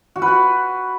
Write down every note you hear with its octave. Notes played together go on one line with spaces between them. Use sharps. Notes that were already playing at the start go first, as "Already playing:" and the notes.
F#4
B4
F#4